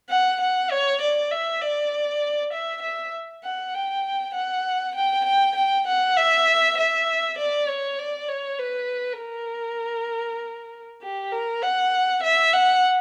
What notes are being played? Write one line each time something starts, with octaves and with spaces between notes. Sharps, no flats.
F#5
F#5
C#5
D5
E5
D5
E5
E5
F#5
G5
F#5
G5
G5
G5
F#5
E5
E5
D5
C#5
D5
C#5
B4
A#4
G4
A#4
F#5
E5
F#5